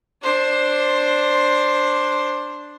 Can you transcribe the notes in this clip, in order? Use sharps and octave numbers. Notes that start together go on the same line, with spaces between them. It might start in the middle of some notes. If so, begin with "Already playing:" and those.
D4 C5